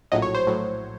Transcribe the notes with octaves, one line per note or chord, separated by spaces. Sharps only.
A#1 A2 F#3 D#5
C#5
C5
A2 F#3